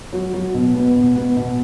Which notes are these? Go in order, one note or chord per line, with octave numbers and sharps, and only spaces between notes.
F#3
F#3
B2
B3
B2
B3
B2